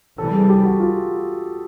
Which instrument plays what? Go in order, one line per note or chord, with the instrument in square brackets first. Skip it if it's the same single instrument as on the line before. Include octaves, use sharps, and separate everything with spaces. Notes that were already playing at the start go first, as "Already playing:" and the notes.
[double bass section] C3 E3 G3 [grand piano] A4
[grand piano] G#4
G4
F#4
F4